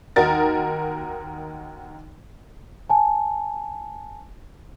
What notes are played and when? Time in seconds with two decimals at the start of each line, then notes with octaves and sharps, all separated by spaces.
0.16 D#2 D#4 F#4 A#4 A6
2.90 G#5 A5